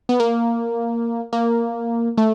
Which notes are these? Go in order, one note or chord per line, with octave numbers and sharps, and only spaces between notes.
B3
A#3
A#3
A3